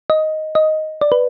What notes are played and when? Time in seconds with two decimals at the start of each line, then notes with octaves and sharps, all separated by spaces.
0.10 D#5
0.55 D#5
1.01 D5
1.12 B4